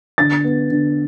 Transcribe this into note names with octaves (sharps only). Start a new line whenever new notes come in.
D3 A6
B3
D3